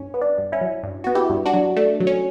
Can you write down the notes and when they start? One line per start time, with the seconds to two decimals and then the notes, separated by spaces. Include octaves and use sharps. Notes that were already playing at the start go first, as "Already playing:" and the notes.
Already playing: G2 C#4
0.14 B3
0.21 D4
0.38 G2
0.52 C#4 E4
0.61 F#3
0.83 G2
1.04 B3 F#4
1.15 E4 G4
1.30 G2
1.45 D4 F#4
1.54 F#3
1.77 A3 D4
2.00 F#3
2.07 C#4